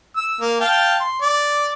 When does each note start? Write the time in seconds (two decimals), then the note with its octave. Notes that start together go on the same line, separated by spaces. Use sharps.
0.16 E6
0.41 A#3
0.60 F5 G5 A5
1.00 C6
1.22 D5